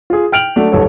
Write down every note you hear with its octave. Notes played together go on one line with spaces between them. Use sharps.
F4 G#4
G5 F6 D7 F7 F#7
F#3 A3 D4
D#1 A1 F#3 G3 A4 C#5